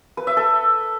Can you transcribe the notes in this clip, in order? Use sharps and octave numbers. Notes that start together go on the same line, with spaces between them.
B4
E5
A4